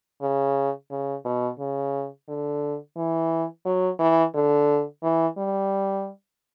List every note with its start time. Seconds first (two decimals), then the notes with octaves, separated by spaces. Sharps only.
0.22 C#3
0.91 C#3
1.25 B2
1.59 C#3
2.29 D3
2.97 E3
3.65 F#3
4.00 E3
4.35 D3
5.03 E3
5.38 G3